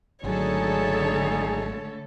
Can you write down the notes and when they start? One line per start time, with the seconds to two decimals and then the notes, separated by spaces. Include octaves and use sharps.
0.24 G#1 D3 F#3 A3 D#4 G#4 A4 C#5